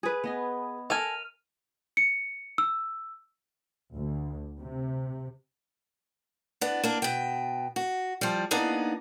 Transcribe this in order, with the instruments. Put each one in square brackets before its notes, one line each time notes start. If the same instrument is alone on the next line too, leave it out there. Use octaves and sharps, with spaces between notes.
[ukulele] G#4 B4
[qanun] B3 D#5 G#5
[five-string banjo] A4 G#5 [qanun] A#4 [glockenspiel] F6 D#7 F7
[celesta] C#7
E6
[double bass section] D2
C3
[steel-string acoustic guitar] B3 D4
A#3 D4
B2 G5
F#4
F3 G3
A#3 B3 D4 D#4 G#4